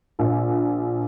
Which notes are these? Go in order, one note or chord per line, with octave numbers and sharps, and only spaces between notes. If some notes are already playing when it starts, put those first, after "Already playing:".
A#1